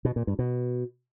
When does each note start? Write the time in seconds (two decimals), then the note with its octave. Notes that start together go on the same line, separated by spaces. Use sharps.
0.05 B2
0.16 A#2
0.27 G2
0.39 B2